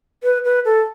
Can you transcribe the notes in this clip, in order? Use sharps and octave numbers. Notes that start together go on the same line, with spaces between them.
B4
B4
A4